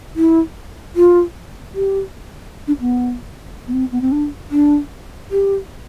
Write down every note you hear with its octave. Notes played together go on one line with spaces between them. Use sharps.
E4
F4
G4
D4
B3
B3
C4
B3
C4
D4
D4
G4